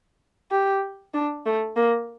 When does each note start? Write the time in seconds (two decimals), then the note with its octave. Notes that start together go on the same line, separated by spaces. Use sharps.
0.51 G4
1.14 D4
1.46 A3
1.76 A#3